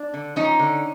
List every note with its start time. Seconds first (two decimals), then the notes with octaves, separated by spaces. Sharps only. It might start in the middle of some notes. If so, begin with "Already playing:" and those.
Already playing: D4
0.14 D3
0.36 F3 C#4 D#4
0.59 D3